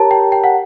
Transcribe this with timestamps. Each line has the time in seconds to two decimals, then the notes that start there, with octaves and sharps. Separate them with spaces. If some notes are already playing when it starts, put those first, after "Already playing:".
Already playing: G4 A#4 C#5 A5 A#5
0.11 G5
0.32 G5
0.44 F#5